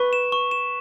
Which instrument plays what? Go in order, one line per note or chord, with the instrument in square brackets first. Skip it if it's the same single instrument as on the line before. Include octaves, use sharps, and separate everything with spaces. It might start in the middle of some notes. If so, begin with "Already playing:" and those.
Already playing: [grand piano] B4 [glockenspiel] C#6
[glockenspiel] E7
C#6
E7